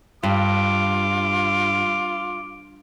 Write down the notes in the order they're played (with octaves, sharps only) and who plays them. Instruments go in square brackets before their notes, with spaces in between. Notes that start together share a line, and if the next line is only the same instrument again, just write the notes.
[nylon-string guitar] G2 [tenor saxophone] F4 [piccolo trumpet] D6